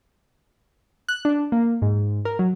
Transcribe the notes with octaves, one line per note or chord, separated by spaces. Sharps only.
F#6
D4
A#3
G#2
A#4
F#3